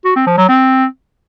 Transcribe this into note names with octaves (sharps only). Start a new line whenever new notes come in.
F#4
C4
F3
F#3
C4